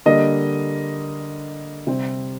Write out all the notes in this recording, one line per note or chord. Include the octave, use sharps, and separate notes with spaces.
D3 G3 A#3 D#5
C3 G3 C4